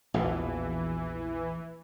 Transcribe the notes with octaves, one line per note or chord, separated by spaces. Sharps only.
A#1 E2 B2 E3